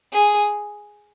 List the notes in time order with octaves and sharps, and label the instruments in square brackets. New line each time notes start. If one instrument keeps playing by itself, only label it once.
[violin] G#4